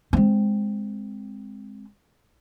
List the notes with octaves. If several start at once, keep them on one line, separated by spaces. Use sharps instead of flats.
G#3 C4